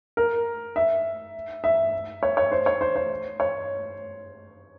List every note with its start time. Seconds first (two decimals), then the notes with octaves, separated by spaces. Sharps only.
0.17 A#4
0.76 E5
1.64 E5
2.23 C#5
2.37 C#5
2.52 C5
2.66 C#5
2.81 C5
2.96 C5
3.40 C#5